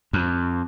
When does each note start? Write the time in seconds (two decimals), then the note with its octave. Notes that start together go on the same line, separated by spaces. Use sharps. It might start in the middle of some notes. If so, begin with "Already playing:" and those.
0.13 F2